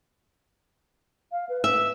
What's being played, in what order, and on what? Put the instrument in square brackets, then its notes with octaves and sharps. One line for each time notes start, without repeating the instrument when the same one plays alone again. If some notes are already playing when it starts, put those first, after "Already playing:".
[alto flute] F5
B4
[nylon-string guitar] E5